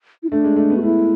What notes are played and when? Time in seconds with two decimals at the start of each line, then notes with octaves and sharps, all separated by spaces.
0.23 E4
0.31 A3 D4
0.44 G#3
0.56 A3
0.70 B3
0.77 F#4
0.83 A3 E4